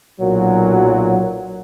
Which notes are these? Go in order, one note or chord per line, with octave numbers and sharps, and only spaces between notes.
B1 A#2 F#3